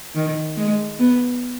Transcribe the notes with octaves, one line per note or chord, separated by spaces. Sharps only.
D#3
G#3
B3